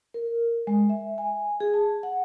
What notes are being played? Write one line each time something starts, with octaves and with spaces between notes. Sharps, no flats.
A#4
G#3
E5
G#5
G#4
A5
F#5